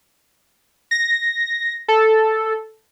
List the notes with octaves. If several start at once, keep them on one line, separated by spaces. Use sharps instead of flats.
A#6
A4